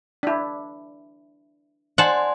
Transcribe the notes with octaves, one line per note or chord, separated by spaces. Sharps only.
D4 E4
C5 D5 F#5 G#5 A5 C6